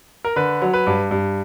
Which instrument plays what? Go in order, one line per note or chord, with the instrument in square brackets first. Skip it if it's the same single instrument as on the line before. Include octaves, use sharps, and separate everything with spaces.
[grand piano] A#4
D3 B4
F#3
B4
G2
G2